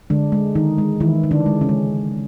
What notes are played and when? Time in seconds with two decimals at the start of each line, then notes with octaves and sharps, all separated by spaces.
0.10 D3 G#3 D4
0.32 G#3
0.55 D#3 D#4
0.78 G#3
1.00 D#3 E3 E4
1.23 D#3
1.31 D3 D4
1.46 G#3
1.61 C#3 C#4
1.69 G#3